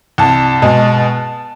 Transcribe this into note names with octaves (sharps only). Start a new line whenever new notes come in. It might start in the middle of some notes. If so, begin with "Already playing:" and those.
C2 A5
B2 G#3